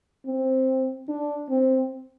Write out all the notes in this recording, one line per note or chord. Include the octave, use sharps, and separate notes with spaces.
C4
D4
C4